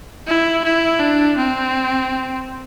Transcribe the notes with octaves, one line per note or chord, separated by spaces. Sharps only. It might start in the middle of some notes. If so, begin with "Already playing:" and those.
E4
E4
D4
C4